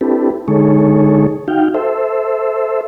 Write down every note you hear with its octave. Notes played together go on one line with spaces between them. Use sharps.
C4 D4 E4 G4 A4 B4
D3 G#3 D#4 G#4 A4 C#5
D#4 F#4 F5 G5
A4 C5 E5